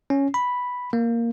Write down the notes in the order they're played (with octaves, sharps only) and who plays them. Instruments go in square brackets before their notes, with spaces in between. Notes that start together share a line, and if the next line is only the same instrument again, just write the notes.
[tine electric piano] C#4
B5
A#3